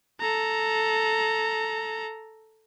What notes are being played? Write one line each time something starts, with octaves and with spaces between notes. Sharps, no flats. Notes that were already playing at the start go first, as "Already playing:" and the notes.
A4 A#5